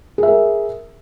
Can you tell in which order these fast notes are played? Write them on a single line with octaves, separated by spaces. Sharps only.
G#4 E5 A#4